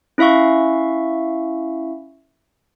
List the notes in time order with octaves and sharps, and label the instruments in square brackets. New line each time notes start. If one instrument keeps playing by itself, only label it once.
[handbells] C#4 E4 E5 F5 C#6